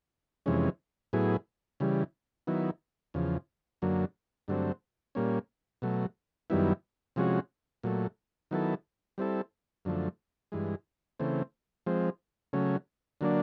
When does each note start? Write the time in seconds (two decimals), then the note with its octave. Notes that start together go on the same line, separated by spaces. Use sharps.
0.46 F2 C3 E3 G#3 C#4
1.13 A2 F#3 B3 E4 G#4
1.80 C#3 E3 G3
2.47 D#3 F#3 B3 E4
3.14 E2 C#3 F3
3.82 F#2 D3 F#3 A#3
4.48 G2 D3 F#3 A3 C4
5.15 A#2 G3 A#3 C#4
5.82 B2 F#3 A3
6.50 F#2 D#3 G3 B3 E4
7.16 C3 F3 G#3 C#4 F#4
7.83 A#2 F#3 A3
8.51 D#3 F#3 B3 E4 A4
9.18 G3 C4 E4 A4
9.85 F#2 D3 F3 A3
10.52 G2 E3 G#3
11.19 C#3 E3 A3 C4
11.86 F3 G#3 C4
12.53 C#3 F#3 A3 C#4
13.21 D3 F#3 A#3 D4